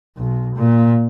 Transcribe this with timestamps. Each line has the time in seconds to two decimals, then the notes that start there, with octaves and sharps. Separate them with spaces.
0.18 B1
0.56 A#2